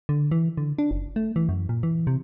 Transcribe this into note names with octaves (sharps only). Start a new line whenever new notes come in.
D3
E3
D3
D4
F#1
A3
E3
F#2
A#2
E3
C3